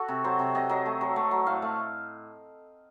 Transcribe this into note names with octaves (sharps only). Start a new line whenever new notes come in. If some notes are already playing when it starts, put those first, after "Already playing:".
Already playing: F#4 A4
C3
F#3 C5
C3
C3 D#5
F#3 D#5
A3
F#3
A3
F#3
A2 F5
A3